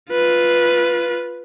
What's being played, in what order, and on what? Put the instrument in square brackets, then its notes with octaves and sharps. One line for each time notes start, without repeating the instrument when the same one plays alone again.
[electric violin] F4 B4